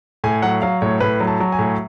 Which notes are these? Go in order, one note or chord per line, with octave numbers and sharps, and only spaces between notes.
A2 G#5
F#3 F#5
F#3 F5
A2 C#5
A2 B4
F#3
A5
F#3
G#5
A2